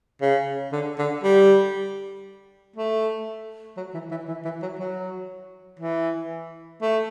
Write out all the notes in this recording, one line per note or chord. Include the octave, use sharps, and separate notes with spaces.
C#3
D3
D3
G3
A3
F#3
E3
E3
E3
E3
F#3
F#3
E3
A3